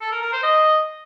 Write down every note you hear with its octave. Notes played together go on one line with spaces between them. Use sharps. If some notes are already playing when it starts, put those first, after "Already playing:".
A4
A#4
A#4
C5
D#5